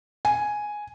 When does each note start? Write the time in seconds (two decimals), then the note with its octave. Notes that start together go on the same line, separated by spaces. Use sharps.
0.25 G#5